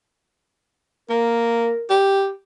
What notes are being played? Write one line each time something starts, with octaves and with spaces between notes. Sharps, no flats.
A#3 A#4
G4